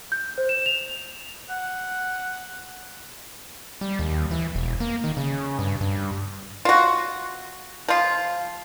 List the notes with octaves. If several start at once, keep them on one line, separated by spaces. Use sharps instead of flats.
G6
C5
E7
F7
F#5
G3
D#2
E3
E1
A#3
D#3
C#3
G2
G2
F4 F#4
F3 F4